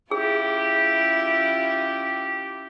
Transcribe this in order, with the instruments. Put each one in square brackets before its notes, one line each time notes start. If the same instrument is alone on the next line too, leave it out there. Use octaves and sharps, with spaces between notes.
[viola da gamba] C#4 E4 F4 [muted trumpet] G4 [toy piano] G#4